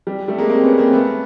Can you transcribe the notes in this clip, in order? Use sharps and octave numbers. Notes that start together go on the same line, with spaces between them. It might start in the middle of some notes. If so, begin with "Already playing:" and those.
G3
G3 A3
G#3 A#3
A#3 C4
B3 C#4
A#3 C4
A3 B3